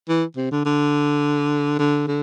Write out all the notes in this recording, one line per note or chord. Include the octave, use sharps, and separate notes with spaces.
E3
C3
D3
D3
D3
D3